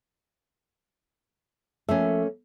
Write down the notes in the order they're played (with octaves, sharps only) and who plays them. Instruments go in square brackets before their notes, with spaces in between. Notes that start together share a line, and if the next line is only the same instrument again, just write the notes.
[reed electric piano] F3 A4 E5 [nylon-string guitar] A3 A#3 C#4